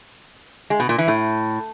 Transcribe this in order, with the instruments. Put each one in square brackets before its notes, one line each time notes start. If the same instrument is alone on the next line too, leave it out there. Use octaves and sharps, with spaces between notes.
[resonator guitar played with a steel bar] G#3
B2
A#2
E3
A2